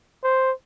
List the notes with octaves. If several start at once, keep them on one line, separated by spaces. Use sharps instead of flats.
C5